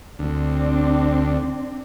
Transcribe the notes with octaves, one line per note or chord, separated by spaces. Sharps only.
D2 C4 D4